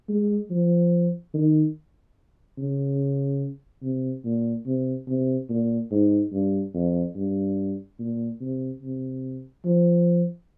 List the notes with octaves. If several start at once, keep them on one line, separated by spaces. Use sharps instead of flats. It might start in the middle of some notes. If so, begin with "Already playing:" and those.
G#3
F3
D#3
C#3
C3
A#2
C3
C3
A#2
G#2
G2
F2
G2
A#2
C3
C3
F3